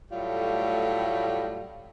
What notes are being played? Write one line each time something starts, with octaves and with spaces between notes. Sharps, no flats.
A2 F#3 G3 A3 F4